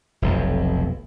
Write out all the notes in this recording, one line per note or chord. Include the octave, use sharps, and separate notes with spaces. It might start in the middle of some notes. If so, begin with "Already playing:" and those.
F1 B1 F2